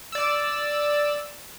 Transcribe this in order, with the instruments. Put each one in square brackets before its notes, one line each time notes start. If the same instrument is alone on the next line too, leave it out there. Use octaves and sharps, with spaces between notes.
[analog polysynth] D5 E6